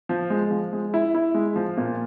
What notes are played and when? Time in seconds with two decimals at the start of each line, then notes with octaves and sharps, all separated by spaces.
0.09 F3
0.30 G#3
0.51 F3
0.73 G#3
0.94 E4
1.15 E4
1.34 G#3
1.56 F3
1.77 A#2